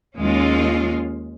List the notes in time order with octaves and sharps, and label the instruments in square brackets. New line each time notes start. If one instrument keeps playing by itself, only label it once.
[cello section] D#2 G#3 C#4 F4